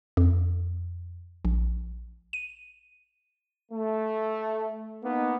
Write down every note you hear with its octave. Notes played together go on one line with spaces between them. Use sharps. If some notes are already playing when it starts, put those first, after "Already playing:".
F2
A#1
D#7
A3
A#3 B3 D#4